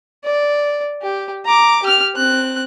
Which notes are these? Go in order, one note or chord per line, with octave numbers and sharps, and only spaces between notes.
D5
G4
A#5 D6
G4 F6
C4 F#6